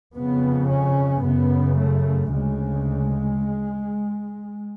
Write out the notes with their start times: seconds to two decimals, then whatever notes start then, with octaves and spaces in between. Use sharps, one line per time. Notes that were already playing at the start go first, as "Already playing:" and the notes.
0.15 F2 C#3 B3
0.70 C#4
1.24 F#2 C#3 B3
1.79 A3
2.32 D2 C#3 G#3